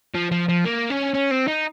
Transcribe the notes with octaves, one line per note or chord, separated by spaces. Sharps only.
F3
F3
F3
A#3
C#4
C#4
C4
D#4